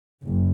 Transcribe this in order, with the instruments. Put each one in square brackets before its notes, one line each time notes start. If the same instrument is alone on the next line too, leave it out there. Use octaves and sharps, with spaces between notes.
[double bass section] F#1